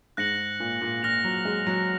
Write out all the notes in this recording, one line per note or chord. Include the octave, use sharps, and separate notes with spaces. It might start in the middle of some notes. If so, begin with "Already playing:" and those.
G#2 F#6 A#6 C#7 F#7
A#2
A#2
A#2 F6 A#6 F7
F#3
G#3
F#3